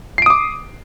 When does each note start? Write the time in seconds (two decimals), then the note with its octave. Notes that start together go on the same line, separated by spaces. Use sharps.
0.18 C7
0.22 D7
0.26 D#6
0.30 D6